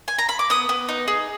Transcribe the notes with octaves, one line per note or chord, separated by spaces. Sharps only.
G#5
A#5
B5
D6
B3 D#6
B3
D#4
G#4